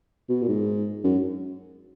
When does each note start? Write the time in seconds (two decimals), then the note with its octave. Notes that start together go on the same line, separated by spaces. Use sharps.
0.29 B2
0.42 A#2
0.48 G#2
1.04 F#2